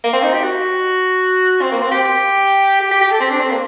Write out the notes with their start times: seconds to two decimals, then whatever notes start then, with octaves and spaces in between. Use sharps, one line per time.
0.04 A#3
0.13 C4
0.23 D#4
0.33 G4
0.43 F#4
1.61 C4
1.72 A#3
1.82 C4
1.91 G4
2.80 G4
2.91 G4
3.01 G4
3.10 A4
3.20 C4
3.30 D4
3.40 C4
3.50 A#3